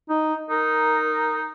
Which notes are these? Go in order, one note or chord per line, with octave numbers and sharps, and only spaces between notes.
D#4
D#4 A#4